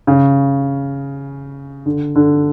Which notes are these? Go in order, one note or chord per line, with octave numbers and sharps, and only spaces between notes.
C#3
D3
D3